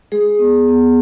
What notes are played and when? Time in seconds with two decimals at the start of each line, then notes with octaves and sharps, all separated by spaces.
0.12 G#3 G#4
0.39 B3
0.68 B3